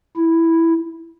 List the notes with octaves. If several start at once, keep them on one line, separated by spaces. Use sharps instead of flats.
E4